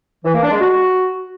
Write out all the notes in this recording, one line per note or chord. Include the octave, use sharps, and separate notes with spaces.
E3
A#3
D4
G#3
F#4